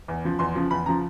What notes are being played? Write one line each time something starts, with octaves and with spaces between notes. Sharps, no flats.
E2
C#3 F3
E2 C6
C#3 F3
E2 B5
C#3 F3 A#5